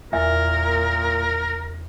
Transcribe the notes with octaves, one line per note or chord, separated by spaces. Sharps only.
E2 A#2 A#4 E5